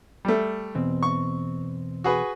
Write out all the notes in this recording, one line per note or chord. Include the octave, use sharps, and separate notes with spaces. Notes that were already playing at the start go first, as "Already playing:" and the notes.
G3 A3
E2 B2 C4
C#6
F#4 G#4 B4